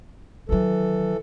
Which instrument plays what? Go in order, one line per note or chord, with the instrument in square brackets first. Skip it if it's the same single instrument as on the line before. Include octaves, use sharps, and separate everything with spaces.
[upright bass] D#3 F#3 [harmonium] E3 A4